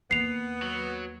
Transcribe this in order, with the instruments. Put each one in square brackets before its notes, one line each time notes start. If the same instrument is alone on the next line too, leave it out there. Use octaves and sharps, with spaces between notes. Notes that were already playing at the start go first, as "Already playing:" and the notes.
[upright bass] D#2 [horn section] B3 [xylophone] C7 F7
[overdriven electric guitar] F#3